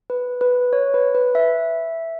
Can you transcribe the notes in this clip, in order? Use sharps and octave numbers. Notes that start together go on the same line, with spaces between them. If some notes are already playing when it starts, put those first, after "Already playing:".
B4
B4
C#5
B4
B4
E5